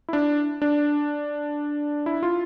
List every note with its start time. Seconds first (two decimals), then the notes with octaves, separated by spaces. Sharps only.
0.09 E4
0.13 D4
0.62 D4
2.06 E4
2.23 F4